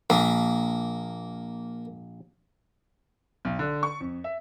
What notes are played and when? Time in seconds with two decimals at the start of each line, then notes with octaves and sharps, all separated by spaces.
0.10 A#1 A#3
3.45 B1
3.59 D3
3.83 C#6
4.00 F2
4.24 E5